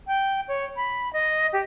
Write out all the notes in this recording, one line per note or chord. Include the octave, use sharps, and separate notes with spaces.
G5
C#5
B5
D#5
G4